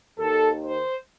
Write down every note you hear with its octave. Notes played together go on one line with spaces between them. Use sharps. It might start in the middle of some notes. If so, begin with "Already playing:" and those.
D#2 D#3 A4
C5